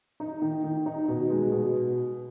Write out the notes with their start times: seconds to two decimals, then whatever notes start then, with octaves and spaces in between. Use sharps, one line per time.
0.20 D#4
0.42 D#3
0.64 D#3
0.86 D#4
1.08 B2
1.30 G#3
1.52 B2